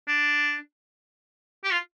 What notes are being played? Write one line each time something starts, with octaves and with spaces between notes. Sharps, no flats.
D4
G4
F4